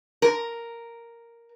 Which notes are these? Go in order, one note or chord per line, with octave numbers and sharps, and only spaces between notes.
A#4